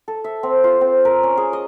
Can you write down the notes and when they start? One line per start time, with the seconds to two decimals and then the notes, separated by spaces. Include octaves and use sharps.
0.08 A4
0.24 E5
0.43 C4
0.64 F4
0.81 C4
1.05 A#4
1.23 C#4
1.37 G#4
1.53 D#5